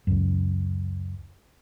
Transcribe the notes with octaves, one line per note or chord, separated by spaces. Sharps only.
C#2 F#2